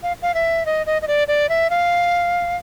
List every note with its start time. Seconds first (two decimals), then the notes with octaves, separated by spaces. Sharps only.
0.03 F5
0.22 F5
0.34 E5
0.66 D#5
0.86 D#5
1.02 D#5
1.08 D5
1.28 D5
1.49 E5
1.70 F5